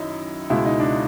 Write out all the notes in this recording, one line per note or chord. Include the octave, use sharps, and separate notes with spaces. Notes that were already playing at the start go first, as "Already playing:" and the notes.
Already playing: F#2 D#3 D#4 E4
C#2 B2 G#3 E4
D#4
D4